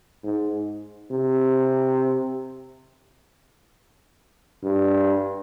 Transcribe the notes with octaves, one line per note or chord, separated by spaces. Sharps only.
G#2
C3
G2